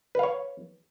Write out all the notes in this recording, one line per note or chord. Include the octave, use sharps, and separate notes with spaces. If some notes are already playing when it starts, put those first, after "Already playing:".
B4 C#5 F5